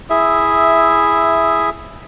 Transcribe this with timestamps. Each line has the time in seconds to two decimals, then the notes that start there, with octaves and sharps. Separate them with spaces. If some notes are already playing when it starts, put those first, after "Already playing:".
0.10 E4 G#4 E5